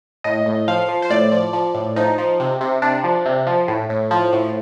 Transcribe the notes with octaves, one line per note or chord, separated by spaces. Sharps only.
A2 D#5
A2
F3 F5
F3
C5
A2 D5
F3
F3
A2
F3 D#4
F3
C3
C3
C3 D4
F3
C3
F3
A2
A2
F3
A2